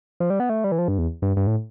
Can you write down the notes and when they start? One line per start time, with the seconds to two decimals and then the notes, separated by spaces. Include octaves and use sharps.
0.20 F3
0.30 G3
0.40 B3
0.50 A3
0.64 G3
0.72 E3
0.79 F3
0.88 G2
0.98 E2
1.22 G2
1.37 G2
1.47 A2